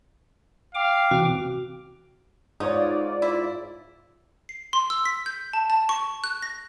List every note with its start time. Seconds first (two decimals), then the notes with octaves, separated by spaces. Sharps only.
0.75 F5 G5 D6
1.11 C3 E3 C4 F#4
2.60 G#2 D#4 F4 C#5 D5
3.22 E4
4.49 C7
4.73 C6
4.90 E6
5.05 B6
5.26 G6
5.53 A5
5.70 A5
5.89 C#6
6.24 F#6
6.42 A#6